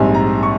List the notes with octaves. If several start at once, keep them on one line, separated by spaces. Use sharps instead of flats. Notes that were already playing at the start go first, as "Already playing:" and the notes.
Already playing: A#1 G#2 G3 C4 G#5
A#5
C#6